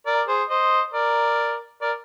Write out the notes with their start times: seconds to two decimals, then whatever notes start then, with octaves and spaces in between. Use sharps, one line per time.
0.06 A#4 D5
0.28 G#4 C5
0.49 C5 D#5
0.94 A#4 D5
1.81 A#4 D5